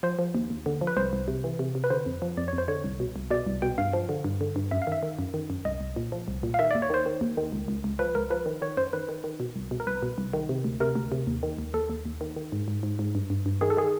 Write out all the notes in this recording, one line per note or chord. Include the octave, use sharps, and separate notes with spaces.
F3 C5
F3
D#2
D#2
D3
F3
B4
C2 C5
C2
C3
E3
C3
C3
B4
D3 C5
F2
F3
F2 D5
C#5
F2
C5
D3 C#5
C2
B2
C2
B2 D5
C2
B2 G5
G2 F5
F3
D3
G2
D3
G2
F#2 E5
F5
D#3 E5
D#3
F#2
D#3
F#2
C2 D#5
C2
A#2
F3
C2
A#2
F5
D#3 E5
D5
D#2
C#5
D#3 C5
D#3
D#2
D#3
C#2
C#2
C#2
F3 B4
C#2 A#4
F3 B4
D#3
D#3 C#5
F#2 C5
D#3 B4
D#3
D#3
B2
C2
B2
A#4
C2 B4
B2
C2
D#3
C3
D2
C3 A#4
D2
C3
D#2
D#3
D#2
D#2 A4
D#2
D#2
D#3
D#3
G#2
G#2
G#2
G#2
G2
G2
G2
D#3 G#4
A4
D#3 G#4